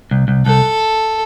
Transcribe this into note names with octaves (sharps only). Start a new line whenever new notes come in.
C2
C2
C2 A4